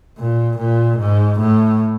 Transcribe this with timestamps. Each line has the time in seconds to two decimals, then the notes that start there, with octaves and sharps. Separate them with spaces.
0.18 A#2
0.58 A#2
0.98 G#2
1.39 A2